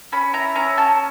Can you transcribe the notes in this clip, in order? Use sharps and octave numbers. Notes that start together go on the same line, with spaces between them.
C#4 B5
E4 A#5
C#4 A#5
C#4 A5